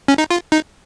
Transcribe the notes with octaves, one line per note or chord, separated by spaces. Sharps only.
C#4
D#4
F4
D#4